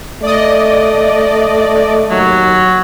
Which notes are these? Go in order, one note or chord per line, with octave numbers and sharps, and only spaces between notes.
A3 D5 D#5
D#2 F#3